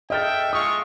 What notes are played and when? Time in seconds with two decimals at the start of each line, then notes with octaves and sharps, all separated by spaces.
0.10 A4 D#5 E5 G5 F6 A6
0.53 G#3 F4 C#6 D#6